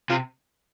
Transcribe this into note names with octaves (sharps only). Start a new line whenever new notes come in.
C3 F4